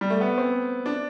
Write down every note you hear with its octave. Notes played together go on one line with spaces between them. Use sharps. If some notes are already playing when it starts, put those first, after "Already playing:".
G3
A3
B3
C4
D4